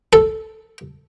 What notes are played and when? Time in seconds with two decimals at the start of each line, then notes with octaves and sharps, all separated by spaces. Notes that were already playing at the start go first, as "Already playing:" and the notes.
0.13 A4